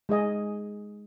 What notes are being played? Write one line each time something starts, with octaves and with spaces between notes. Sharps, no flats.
G#3 G#4 D#5 G#5